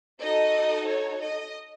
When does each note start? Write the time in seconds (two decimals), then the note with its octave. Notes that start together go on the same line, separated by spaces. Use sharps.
0.22 D#4 F#4 A4 D#5
0.88 C#5
1.23 D#5